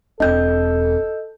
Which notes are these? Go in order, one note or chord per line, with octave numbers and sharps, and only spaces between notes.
E1 C4 D4 A4 D#5 G6